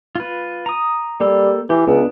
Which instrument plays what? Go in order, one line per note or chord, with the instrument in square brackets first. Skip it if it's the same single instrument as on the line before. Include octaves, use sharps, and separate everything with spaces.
[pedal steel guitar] F4 B4
A#5 D#6
[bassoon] G3 [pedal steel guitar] A#3 G4 A4
[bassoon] E3 [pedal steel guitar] G4
[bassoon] C#2 [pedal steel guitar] B3 D4